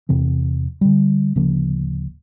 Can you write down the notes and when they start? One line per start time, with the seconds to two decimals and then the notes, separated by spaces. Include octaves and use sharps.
0.09 E2 C3 E3 C4
0.81 D3 G3
1.36 D1 C#3 F3 A#3